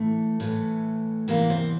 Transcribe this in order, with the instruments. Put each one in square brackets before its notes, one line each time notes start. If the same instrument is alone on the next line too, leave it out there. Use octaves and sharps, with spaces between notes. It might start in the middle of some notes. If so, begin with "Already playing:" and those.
Already playing: [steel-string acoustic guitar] A2 E3 A3
A2 E3
E2 C3 E3 A#3
C4